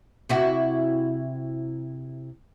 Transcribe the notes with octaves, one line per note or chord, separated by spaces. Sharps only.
C3 E4 F#4